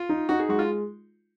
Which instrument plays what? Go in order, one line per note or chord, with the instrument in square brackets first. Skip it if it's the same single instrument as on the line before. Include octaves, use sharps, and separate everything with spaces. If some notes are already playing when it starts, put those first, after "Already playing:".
Already playing: [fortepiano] F4
[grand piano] D#4
[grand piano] D#4 [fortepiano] F#4
[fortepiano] G#4
[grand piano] G#3 [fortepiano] F#4
[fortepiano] F4